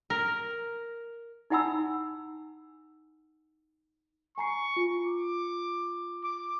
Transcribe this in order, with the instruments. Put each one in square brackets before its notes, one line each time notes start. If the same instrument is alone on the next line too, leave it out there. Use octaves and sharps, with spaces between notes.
[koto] A#4
[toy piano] D#4 E4 F#5 G#5 B5 E6
[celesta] G#5 A#5 C7 [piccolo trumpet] C#6
[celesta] F4
[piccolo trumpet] D6
D6